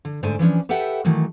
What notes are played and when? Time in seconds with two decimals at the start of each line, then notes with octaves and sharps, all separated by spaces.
0.05 D3
0.23 G#2 D3 A3 C5 D5 G#5
0.39 E3 F3 C#4 D4
0.69 G4 A4 B4 E5 F#5 G5
1.05 D#3 E3 F#3 A3